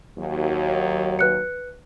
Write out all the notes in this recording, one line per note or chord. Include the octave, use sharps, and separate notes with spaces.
D#2 F#3
B4 F#6 C#7